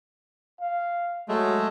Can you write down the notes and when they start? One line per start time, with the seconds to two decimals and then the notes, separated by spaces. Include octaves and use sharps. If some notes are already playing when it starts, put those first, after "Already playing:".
0.61 F5
1.29 F#3 G#3 A3